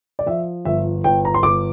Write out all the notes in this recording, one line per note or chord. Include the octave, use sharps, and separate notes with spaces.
D5
F3 E5
G1 E5
G1 G5
A#5
C6
G1 D6